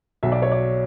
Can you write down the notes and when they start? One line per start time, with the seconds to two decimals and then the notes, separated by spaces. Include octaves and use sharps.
0.23 B1 B2 F#3 E5
0.32 D5
0.42 C#5
0.52 D5